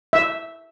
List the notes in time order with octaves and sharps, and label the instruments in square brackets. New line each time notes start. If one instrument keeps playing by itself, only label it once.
[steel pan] E5